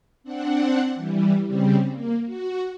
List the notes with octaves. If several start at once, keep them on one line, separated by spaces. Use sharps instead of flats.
C4 D4 F#5
E3 G3
C#3 G3 C4
A#3
F#4